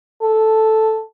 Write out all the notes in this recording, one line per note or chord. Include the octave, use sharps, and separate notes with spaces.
A4